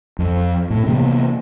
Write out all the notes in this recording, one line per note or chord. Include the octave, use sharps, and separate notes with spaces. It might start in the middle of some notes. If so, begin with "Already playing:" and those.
F2
A2
C3 E3 A#3 B3